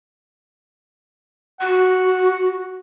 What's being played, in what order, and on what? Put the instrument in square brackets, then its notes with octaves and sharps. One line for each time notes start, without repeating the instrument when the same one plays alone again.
[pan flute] F#4 [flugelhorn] F#5